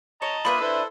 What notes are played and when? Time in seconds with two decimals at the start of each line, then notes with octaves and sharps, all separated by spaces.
0.22 C#5 D#5 A5 A#5
0.45 A#3 D4 F4 B4 E5 B5 D#6
0.60 E4 A4 C5